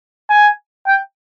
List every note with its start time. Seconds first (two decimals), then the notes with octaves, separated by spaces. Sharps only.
0.30 G#5
0.87 G5